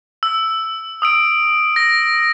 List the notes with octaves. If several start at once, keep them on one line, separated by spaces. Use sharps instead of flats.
E6
D#6 E6 D7
A#6